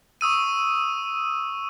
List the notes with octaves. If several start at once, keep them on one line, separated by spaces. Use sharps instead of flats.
C#6 D#6 E6 D#7